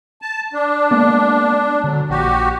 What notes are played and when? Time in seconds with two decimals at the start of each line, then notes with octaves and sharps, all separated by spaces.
0.22 A5
0.53 D4
0.91 G#3 A#3 B3
1.84 D3 F#3
2.10 A#1 F#4 G4